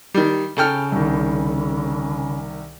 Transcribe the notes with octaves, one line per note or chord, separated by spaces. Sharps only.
D#3 G3
C#3 A4 G5 F6
C2 D#3